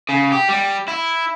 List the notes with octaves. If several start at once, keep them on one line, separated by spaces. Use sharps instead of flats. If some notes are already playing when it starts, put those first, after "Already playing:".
C#3
G4
G3
E4